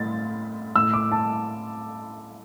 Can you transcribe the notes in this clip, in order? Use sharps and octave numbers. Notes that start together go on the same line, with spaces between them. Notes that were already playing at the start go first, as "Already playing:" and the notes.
Already playing: A2 A6
A2 A3 E6
D6
A5